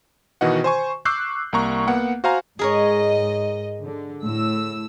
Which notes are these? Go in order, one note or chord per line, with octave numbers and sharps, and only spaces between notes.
B2 D#3 E3 F#4 D#5 F#5
C5 G#5 C#6
C#6 D6 E6 F#6 G6 C7
C2 A#3 A#5 C#6
A#3 B3 F#5
F#4 C5 F5 G#5 A#5
G#2 G#4 A#4 C#5 D#5
D3
A2 E6